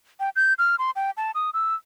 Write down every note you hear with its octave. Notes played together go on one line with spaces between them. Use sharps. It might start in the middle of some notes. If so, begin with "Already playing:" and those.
G5
G6
F6
C6
G5
A5
D#6
E6